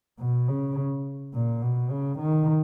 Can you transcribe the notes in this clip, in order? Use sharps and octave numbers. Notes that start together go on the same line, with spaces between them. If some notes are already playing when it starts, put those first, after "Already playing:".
B2
C#3
A#2
B2
C#3
D#3